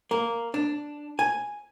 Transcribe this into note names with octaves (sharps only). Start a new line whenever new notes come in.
A#3
D4
G#5